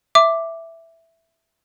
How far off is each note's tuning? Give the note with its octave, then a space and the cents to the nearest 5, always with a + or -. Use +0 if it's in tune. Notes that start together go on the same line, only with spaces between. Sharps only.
E5 +0 D6 +0